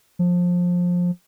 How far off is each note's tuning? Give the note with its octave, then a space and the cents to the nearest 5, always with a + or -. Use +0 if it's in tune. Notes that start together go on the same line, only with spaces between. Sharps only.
F3 +20